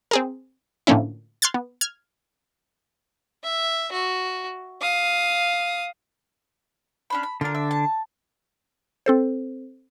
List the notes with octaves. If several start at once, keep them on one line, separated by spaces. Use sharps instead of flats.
C4 G#4 A#4
A2 D3 F3 A#3 C#4 E4
C6 F6 F#6 G#6 A6
B3
F6 G#6
E5
F#4
F5 D#6
C#4 D4 B5
B5
D3 D4 F4 A#4
E5
A5
C4 A4 C5